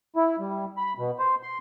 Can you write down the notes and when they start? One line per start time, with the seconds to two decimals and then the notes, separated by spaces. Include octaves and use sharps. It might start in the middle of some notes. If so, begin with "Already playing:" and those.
0.16 E4
0.39 G3
0.77 B5
0.98 B2
1.19 C5
1.43 C6